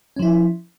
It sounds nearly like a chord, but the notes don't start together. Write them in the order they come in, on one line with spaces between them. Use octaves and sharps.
C#4 F3 E4